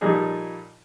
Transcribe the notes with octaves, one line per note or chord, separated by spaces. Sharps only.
A#2 F3 G3 D#4 G#4 A4